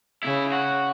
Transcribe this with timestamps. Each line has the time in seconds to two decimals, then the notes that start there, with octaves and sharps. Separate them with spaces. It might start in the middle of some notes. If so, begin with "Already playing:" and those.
0.23 C#3 E4
0.52 F#4